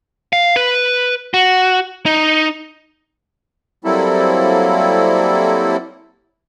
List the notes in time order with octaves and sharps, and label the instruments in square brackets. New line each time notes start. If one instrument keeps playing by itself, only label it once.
[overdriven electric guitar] F5
B4
F#4
D#4
[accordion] F#3 G3 A#3 C4 E4 A4